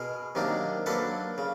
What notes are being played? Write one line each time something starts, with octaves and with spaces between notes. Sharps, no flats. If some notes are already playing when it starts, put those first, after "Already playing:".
Already playing: B2 G#4 A#4
C3 D#3 F#3 A#3 D4
F#3 A#3 D4 A4 B4
C#3